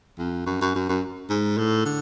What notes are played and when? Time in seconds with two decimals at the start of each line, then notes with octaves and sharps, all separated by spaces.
0.18 F2
0.46 F#2
0.61 F#2
0.75 F#2
0.89 F#2
1.29 G#2
1.58 A2
1.85 D3